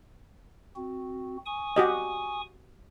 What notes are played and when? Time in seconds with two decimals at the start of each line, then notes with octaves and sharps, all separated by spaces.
0.76 C4 F#4
1.46 G#5 C#6 D#6
1.76 F#4 G4 D#5